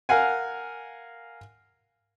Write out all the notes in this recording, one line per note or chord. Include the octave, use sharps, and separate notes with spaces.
A#4 F5 F#5 G#5